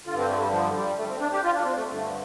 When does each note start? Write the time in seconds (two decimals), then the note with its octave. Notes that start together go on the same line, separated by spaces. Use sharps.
0.06 D3 F4
0.10 G2
0.18 C4
0.29 A3
0.40 G3
0.52 F3
0.75 G3
0.98 A3
1.08 C4
1.20 D4
1.32 G4
1.43 F4
1.55 D4
1.65 C4
1.77 A3
1.88 G2 D3 A3